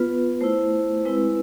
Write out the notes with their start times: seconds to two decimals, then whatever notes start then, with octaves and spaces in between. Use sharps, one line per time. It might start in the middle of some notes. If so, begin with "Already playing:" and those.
Already playing: B3 F4 B4
0.41 A3 E4 C5
1.05 G#3 C4 E4 B4